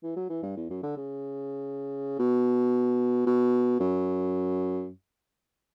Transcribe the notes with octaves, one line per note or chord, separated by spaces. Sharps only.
E3
F#3
E3
G2
E2
F#2
D3
C#3
B2
B2
F#2